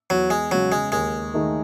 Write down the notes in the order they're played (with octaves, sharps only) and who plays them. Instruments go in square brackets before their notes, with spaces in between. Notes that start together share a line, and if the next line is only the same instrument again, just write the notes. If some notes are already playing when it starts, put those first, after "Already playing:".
[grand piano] E2 [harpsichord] F#3
[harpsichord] G#3
[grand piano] C#3 G#3 [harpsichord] F#3
[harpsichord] G#3
[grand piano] D#2 [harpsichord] G#3
[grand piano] D#3 A3 D#4 G#4